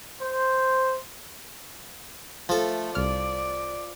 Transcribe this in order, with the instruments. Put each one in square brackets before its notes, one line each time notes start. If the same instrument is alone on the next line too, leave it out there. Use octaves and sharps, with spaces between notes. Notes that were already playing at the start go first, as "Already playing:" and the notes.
[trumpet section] C5
[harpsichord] F3 A4 [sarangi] A3
[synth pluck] C2 F6 [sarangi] D5